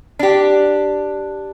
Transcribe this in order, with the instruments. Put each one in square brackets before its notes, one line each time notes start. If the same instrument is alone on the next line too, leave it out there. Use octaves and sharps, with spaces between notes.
[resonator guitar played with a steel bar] D4 G4